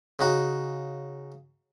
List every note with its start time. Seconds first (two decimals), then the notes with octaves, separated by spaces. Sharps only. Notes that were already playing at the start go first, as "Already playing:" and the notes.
0.19 C#3 D#4 F#4